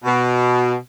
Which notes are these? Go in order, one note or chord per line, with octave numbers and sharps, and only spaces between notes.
B2